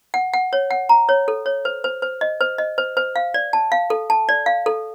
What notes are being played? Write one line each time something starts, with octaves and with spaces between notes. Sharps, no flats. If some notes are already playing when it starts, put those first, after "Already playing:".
F#5
F#5
C#5
F#5
A#5
C#5
A4
C#5
C5
C5
C5
D#5
C5
D#5
C5
C5
F5
D5
A5
F5
A4
A5
D5
F5
A4